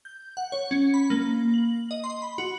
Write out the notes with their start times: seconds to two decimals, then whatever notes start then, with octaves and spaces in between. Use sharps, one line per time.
0.05 G6
0.37 F#5
0.52 C#5
0.71 C#4
0.94 B5
1.10 A#3
1.54 F#7
1.91 D#5
2.04 C6
2.22 B5
2.38 F#4